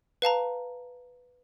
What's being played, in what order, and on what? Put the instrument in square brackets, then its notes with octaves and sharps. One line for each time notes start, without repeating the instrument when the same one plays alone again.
[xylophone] B4 F5 A5 A#5